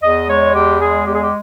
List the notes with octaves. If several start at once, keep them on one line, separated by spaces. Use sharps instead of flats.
E2 D#5
G#3 C#5
E2 G4
G#3 G#4
E2 G4
G#4
G4